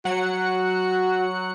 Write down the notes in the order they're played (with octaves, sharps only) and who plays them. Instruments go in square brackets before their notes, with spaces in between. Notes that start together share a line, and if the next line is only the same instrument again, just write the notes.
[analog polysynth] F#3 F#5 C#7 [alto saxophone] F#4